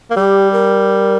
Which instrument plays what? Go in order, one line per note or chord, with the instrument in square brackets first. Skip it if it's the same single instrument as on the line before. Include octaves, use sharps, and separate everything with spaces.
[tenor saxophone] A#3
[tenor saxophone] G3 [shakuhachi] G4
[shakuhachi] A#4